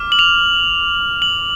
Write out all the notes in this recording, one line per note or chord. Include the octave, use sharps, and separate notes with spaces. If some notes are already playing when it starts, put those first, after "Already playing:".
Already playing: D6 F6
F#7
F7
F#7